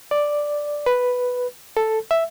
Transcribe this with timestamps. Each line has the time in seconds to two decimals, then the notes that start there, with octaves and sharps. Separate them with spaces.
0.11 D5
0.86 B4
1.77 A4
2.11 E5